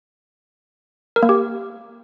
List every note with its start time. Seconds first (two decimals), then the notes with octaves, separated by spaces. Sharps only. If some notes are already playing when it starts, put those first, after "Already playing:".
1.16 A#4
1.23 A#3
1.29 G4